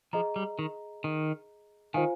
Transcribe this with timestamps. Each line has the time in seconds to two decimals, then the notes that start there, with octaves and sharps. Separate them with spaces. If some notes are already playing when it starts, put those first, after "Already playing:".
0.13 F3 G#4 D#5 A#5
0.36 G3
0.59 D#3
1.04 D#3
1.94 D#3 F4 C5 F5 G#5